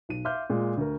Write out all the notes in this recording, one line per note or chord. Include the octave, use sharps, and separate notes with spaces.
B1 D#7
E5 F5 C6 D6 F6 G6
A#2 G#3
D2 A#4